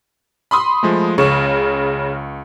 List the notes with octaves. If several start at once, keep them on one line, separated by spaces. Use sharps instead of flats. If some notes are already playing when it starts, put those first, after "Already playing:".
B5 C6 D#6
F3 G#3 A3
C#2 C#3 C#6